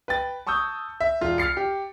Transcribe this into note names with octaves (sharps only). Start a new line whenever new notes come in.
B4 G5 A6
A5 C#6 D#6 E6 G6
E5
E1 F4
F6 A6 C7 C#7
G4